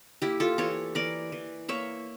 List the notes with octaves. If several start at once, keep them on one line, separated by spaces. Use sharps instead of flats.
A#3 E4 G4
F4 A4
E3 A4 C#5
E3 A#4 D5
E3
A#3 C#5 E5